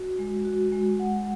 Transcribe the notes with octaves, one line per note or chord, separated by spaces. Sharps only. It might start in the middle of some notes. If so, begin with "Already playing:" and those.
Already playing: F#4
G#3
F#4
G#3
F#5